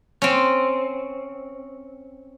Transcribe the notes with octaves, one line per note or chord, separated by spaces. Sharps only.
C4 C#4